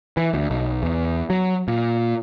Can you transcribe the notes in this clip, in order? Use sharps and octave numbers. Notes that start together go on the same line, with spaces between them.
E3
D2
B1
E2
F#3
A#2